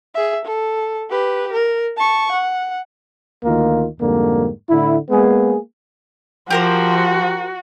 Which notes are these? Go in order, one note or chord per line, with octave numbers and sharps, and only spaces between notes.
G#4 E5
A4
G4 B4
A#4
A5 C#6
F#5
D2 D#3 A#3 F4
F2 G#2 D3 G3 A#3
A2 D3 E4
G#3 A#3 B3 G#4
F3 F#4 G4 A#4 C5